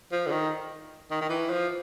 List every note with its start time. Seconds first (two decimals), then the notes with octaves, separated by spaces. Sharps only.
0.12 F3
0.27 D3
0.31 D#3
1.11 D#3
1.21 D#3
1.29 E3
1.50 F3